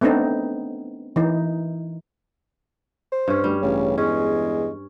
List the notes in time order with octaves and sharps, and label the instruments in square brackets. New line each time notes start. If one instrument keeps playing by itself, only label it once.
[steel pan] A3 B3 C4 D4 D#4
E3 D#4
[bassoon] C5
[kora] G2 C#4
[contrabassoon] D2 [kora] G3
[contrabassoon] A1 [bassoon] C#3
[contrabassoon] E2 [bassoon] G#3 [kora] C#4